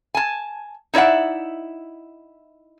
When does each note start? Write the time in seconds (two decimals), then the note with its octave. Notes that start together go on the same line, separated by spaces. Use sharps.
0.15 G#5 A5
0.94 D#4 E4 D5 E5 F#5